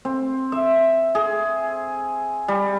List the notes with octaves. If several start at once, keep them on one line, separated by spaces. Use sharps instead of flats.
C4
E5
G#4
G3